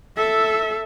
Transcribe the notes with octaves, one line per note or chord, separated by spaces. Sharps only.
A4 E5